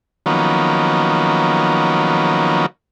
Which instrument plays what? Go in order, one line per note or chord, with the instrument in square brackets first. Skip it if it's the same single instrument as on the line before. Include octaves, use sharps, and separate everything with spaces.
[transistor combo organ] D#3 F3 F#3 A#3 B3 C#4